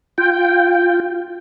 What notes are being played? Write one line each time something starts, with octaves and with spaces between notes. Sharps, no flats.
F4 G5